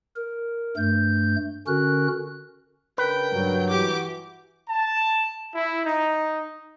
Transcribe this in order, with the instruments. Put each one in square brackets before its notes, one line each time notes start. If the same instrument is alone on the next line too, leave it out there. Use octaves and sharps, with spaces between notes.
[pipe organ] A#4
G2 A3 G6
D3 C#4 F#4 A#4 F#6
[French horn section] C#3 D4 A#4 [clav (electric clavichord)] B4 [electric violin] G5
[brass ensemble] G2 F#3
[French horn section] E3 F#4 [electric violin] G4 D6
[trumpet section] A5
E4
D#4